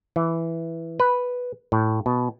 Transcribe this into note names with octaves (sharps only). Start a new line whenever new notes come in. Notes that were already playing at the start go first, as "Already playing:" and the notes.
E3
B4
A2
B2